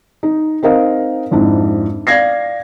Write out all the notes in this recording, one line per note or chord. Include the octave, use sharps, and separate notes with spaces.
D#4
C4 D#4 A#4 D#5 F5
F2 G#2 D4 E4
D5 F5 G#6 A#6 C7